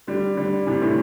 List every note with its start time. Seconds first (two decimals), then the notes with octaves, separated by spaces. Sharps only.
0.07 D3 G3
0.37 D3 G3
0.67 C3 E3
0.81 A2 D3